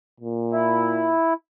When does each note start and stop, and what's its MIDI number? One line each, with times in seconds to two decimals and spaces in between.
0.20 1.17 46
0.52 1.33 64